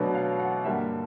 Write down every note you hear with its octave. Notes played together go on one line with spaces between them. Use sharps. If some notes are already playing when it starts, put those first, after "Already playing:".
Already playing: B2 F#3 A3 D4 B4
F5
F#5
G2 D3 G3 A#3 E5